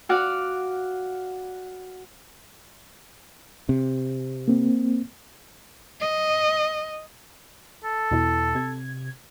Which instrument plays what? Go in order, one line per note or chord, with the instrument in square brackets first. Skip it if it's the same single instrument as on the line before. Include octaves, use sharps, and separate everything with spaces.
[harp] F#4 D5 F5 F#5
[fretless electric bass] C3
[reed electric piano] A#3 C4
[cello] D#5
[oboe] A4
[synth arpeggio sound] E2 B2 E4
C3 G#6